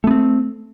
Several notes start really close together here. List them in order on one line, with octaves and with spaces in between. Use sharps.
A3 B3 C4